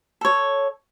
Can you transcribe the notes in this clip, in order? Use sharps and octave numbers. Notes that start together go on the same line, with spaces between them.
A4 C#5